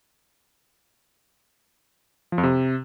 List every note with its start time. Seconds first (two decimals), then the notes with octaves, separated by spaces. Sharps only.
2.32 F3
2.38 F2
2.43 C3